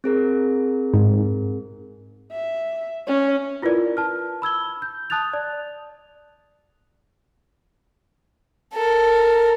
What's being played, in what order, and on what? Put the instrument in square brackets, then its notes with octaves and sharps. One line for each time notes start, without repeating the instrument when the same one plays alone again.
[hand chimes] C4 G#4 A#4
[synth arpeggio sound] G#2
[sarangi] E5
C#4
[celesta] E4 F4 A#4 B4 D5
A5 F6
B5 E6 G#6 G7
G6
A5 D#6 F#6 A6 F7
D5
[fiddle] A4 A#4